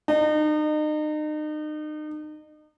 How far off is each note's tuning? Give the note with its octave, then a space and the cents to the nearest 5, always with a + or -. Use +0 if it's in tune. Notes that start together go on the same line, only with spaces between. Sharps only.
D#4 -35